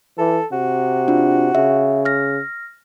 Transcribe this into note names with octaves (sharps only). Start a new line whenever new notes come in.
E3 A4
C3 F#4
D4 F4
C#3 E5
F6 A#6